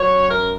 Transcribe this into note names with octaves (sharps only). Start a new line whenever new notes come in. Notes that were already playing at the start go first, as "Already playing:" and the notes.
Already playing: F#3 C#5
C#4
F#2 A#4